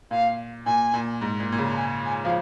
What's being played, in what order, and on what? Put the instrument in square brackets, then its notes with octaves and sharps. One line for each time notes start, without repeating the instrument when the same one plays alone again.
[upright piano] A#2 [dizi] F5
[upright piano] A#2 [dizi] G#5
[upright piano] A#2
G#2
A#2
A#2
C#3
[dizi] A#5
G#5
G#5
[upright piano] F3 [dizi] F5